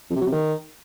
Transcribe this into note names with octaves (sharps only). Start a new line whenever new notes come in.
F2
C3
F#3
C3
D#3